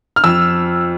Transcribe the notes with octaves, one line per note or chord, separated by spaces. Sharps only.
F6
F2 E6